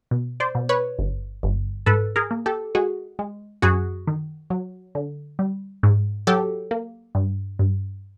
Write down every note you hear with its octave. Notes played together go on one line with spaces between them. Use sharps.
B2
C5 D5
B2
B4 C#5
G1
G1
G#2 A4 B4
G#4 A#4
A#3
G4 A4
G#3 F#4 G#4
G#3
F#2 F#4 G#4
D#3
F#3
D3
G3
G#2
F#3 G4 A4
A#3
G2
G2